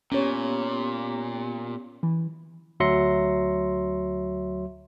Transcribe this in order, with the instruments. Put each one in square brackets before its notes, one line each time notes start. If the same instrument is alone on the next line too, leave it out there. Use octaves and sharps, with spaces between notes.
[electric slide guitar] A#2 [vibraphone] B3 G4 [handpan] C#4 C#5
[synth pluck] E3
[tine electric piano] D2 F#3 E5 C6 A#6 C#7